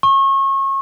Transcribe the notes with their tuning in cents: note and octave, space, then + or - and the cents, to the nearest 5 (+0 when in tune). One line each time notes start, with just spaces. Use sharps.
C#6 -30